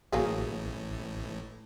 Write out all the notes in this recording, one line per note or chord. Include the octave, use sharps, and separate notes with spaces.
A1 A2 F#3 A#3 G#4